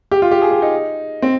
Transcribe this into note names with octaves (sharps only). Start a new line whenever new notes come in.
G4
F4
G4
G#4
G4
D#4
C4